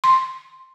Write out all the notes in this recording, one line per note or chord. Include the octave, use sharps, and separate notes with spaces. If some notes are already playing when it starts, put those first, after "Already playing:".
C6